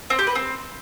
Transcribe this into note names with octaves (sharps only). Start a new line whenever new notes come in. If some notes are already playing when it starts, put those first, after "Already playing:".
C4
G4
B4
C4